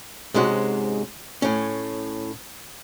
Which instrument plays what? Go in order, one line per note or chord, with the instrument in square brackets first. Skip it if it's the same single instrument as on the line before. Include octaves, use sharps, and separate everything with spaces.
[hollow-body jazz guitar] G#2 C3 G#3 C#4 F#4
A2 C#4